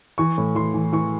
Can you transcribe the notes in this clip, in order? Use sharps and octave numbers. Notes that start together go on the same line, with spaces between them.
E3 C#6
A2
E3 C6
E3
E3 C#6